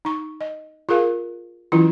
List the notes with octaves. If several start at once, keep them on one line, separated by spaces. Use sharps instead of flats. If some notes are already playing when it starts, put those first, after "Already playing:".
D#4 C#6
D#5
F4 G#4 A#4 F5
E3 F#3 C#4 E4 F4